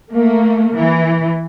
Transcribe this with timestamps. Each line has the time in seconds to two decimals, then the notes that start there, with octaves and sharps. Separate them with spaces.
0.12 A3 A#3
0.75 E3